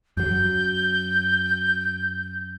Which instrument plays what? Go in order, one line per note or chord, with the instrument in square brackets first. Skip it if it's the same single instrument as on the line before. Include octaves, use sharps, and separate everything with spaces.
[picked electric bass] F#2 F#3 [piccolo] G6